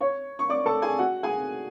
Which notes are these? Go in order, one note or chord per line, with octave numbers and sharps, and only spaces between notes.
C#5 C#6
C#6
D5 D6
A4 A5
G#4 G#5
F#4 F#5
G#4 G#5